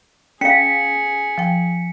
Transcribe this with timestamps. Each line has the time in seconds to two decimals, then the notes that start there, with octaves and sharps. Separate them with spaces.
0.41 C#4 G#4 F5 B6 C#7
1.38 F3 G5